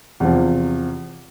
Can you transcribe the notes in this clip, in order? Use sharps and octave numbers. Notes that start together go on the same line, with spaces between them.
E2 C3 F3